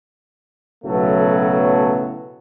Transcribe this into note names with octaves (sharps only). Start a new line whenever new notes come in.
B1 A2 C#3 F#3 A3 B3